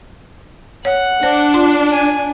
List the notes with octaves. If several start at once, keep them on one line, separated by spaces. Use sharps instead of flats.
C#5 F#5
D4 C5
F4 C6
G#5